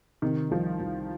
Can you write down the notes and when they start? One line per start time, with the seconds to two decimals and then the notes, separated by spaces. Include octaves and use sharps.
0.22 C3 D#3
0.51 C2 F3
0.80 C2